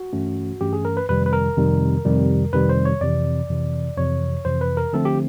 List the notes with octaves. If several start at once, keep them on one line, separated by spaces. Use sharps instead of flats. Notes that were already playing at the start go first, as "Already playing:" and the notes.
Already playing: F#4
G2 E3 A3 C#4
G2 E3 A3 C#4 G4
G#4
A#4
B4
F2 C3 D#3 G3 B4
B4
A#4
F2 C3 D#3 G3
F2 C3 D#3 G3
F2 C3 D#3 G3 B4
C5
C#5
F2 C3 E3 D5
F2 C3 E3
F2 C3 E3 C#5
F2 C3 E3 C5
B4
A#4
D3 F3 A3 C4 A4
G4